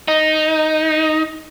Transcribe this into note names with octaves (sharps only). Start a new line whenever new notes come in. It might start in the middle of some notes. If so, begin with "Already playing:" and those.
D#4